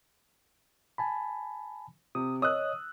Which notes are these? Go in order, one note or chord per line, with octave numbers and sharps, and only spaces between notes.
G#5 A5 B5
C3 D#6
C#5 D#5 D#6 E6 F#6